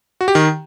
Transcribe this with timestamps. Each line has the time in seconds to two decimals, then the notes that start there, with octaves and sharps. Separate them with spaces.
0.21 F#4
0.28 G4
0.35 D#3